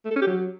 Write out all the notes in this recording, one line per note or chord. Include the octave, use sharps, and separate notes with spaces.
A3
A4
C#4
G4
F#3